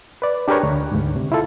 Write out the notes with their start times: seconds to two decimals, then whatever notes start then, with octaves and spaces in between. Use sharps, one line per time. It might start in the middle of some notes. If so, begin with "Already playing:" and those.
0.22 B4 D5
0.48 D4 G4 G#4 A#4 B4 C#5
0.63 D2
0.92 D2 G#2
1.16 C3
1.32 E4 F4 A4